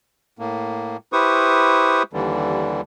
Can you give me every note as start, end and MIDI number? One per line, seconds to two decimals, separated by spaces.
0.39 0.97 45
0.39 0.97 58
1.13 2.03 64
1.13 2.03 67
1.13 2.03 71
1.13 2.03 72
1.13 2.03 85
1.13 2.03 87
2.13 2.81 39
2.13 2.81 50
2.13 2.81 52
2.13 2.81 55